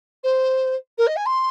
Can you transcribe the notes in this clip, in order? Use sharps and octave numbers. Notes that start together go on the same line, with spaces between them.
C5
A#4
D#5
G#5
C6